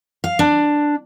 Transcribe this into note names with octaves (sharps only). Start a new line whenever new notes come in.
F5
D4